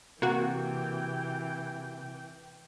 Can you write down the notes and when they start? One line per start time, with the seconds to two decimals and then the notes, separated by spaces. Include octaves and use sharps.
0.22 C3 E3 A#3 F#4 G5